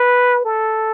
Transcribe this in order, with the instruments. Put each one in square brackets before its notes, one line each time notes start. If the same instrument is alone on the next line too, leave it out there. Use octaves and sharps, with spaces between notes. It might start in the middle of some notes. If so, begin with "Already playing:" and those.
Already playing: [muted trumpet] B4
A4